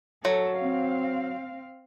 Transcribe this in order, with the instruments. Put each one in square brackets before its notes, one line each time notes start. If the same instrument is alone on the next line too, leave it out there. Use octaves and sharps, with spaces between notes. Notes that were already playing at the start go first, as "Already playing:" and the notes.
[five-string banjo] F#3 [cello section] A4
[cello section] C4 F5